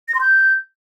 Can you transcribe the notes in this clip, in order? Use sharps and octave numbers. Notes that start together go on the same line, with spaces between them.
A#6
C6
G6